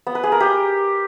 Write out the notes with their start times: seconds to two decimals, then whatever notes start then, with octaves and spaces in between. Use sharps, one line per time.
0.07 B3
0.15 B4
0.23 G#4
0.32 A#4
0.40 G4